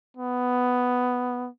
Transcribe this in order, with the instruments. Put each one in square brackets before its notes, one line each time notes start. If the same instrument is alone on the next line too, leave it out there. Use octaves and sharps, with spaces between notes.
[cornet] B3